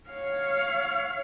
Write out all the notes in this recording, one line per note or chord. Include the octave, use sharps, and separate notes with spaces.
C#5 F5